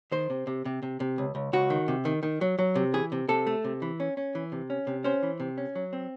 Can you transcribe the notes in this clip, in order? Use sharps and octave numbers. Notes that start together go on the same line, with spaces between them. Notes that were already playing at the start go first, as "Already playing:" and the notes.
D#3 C5
C3
C3
C3
C3
C3
C#2
C#2
C#2 F#4
D#3
C3
D#3
D#3
F#3
F#3
C3
E3 G#4
C3
C3 A4
A3
C3
E3
C#4
C#4
E3
C3
C#4
C3
C#4 C5
E3
C3
C#4
F#3
C4